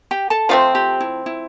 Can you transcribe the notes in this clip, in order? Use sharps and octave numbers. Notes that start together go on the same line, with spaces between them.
G4 G5
A4 A5
F3 A3 C4 F4 F5
G4
E4
E4